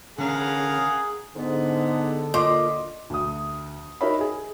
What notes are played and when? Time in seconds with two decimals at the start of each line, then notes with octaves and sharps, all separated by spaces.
0.18 D3 C#4 G#4 A#4 F5 F#5
1.36 G#2 D3 B3
2.34 A#2 D#5 C6 D6
3.10 D2 D#6
4.01 D#4 F#4 A#4 C#5 E5 B5
4.21 G#4